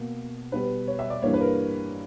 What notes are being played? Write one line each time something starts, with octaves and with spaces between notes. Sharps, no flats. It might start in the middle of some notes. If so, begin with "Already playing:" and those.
Already playing: B2 A#3
B2 G3 B3 B4
C#5
E5
D5
G2 E3 G3 A#3 C#5
B4
A#4